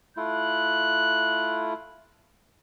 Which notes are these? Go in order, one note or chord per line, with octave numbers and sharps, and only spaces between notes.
A3 E4 F4 F#6